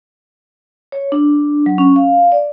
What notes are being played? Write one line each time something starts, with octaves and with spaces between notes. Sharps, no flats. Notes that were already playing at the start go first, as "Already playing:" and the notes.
C#5
D4
F#3
C#4
F5
D5